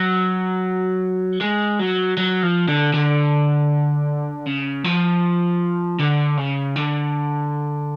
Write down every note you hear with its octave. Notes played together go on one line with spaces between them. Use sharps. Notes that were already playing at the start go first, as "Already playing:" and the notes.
Already playing: F#3
G#3
F#3
F#3
F3
D3
D3
C#3
F3
D3
C#3
D3